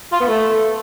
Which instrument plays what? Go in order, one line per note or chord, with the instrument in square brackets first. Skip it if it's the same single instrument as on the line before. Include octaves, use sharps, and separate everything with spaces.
[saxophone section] F4
B3
A3